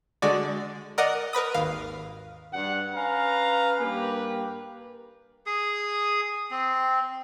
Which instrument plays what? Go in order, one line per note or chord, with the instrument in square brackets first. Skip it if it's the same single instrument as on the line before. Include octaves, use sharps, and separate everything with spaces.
[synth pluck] D3 G#3 F#4 D5
A#4 D5 D#5 F#5 D#6
A#4 B4 B5 D#6
G#1 D#2 F5
[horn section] G2 F#5
C#4 B4 F5 A#5
G2 A#3 G4 B4
[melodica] G#4 D#6
C4